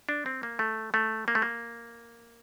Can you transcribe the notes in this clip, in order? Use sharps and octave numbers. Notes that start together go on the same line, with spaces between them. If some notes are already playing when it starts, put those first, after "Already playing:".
D4
C4
A#3
A3
A3
A#3
A3
A#3